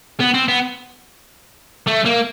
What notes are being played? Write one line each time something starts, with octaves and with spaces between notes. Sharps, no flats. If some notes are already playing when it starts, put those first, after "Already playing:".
B3
C4
B3
A3
A#3